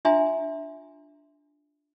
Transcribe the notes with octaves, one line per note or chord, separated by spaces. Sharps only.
D4 F4 E5 G#5 A#5 C6